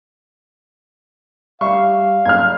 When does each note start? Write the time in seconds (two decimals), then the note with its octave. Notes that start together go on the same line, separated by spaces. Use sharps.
1.61 G3 E5 F5 C#6
2.26 F#1 F6 G#6